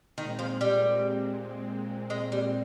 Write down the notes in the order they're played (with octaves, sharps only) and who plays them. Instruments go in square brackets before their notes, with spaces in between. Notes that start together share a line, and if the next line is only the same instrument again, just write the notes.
[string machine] A#2 G#3 C4 [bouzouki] D#3
[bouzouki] F3
G3
G#3
G3